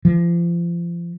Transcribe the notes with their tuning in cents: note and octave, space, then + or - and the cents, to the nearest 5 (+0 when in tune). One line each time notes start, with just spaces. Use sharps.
F3 -30